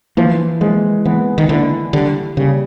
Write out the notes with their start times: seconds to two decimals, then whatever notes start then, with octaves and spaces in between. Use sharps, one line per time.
0.17 E3 F3
0.61 F3 G#3
1.05 E3 B3
1.38 D#3
1.49 D3 E4
1.93 D3 G3
2.37 C#3 G3